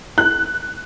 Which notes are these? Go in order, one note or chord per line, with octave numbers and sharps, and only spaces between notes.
F#6